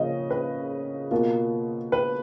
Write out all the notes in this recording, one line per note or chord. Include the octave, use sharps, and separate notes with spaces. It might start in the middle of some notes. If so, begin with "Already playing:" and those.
Already playing: C#3 F3 A#3 F4 D#5
B4
B2 A#3 F4
B4